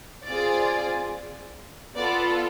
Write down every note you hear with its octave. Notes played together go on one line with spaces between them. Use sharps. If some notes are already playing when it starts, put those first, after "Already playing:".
C4 F4 G#4 D5
B3 F4 A4 D5